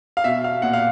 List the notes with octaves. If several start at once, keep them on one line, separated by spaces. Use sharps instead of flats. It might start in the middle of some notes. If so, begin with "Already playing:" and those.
F5
B2 E5
F5
A#2 F#5
F5